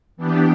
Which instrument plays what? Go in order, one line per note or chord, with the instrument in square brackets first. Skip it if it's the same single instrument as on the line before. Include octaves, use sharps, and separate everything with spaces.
[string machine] E3 B3 D4 G4